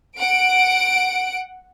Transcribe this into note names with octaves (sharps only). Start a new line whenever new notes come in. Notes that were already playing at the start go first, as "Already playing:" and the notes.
F#5 D7